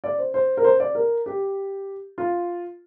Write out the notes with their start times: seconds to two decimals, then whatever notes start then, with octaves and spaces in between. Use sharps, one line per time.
0.04 D5
0.18 C5
0.34 C5
0.57 A#4
0.64 C5
0.80 D5
0.95 A#4
1.26 G4
2.18 F4